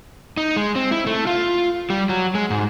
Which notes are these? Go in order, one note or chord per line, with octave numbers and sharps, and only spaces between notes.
D#4
G#3
C4
E4
A3
F4
G3
F#3
G#3
G#2